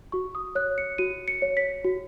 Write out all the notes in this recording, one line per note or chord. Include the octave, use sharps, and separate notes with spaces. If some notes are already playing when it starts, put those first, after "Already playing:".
F#4 C#6
D#6
C#5 F#6
C#7
F#4 D#7
C#7
C#5
B6
F#4